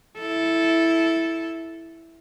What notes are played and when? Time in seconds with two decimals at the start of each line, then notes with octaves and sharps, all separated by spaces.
0.19 E4 A4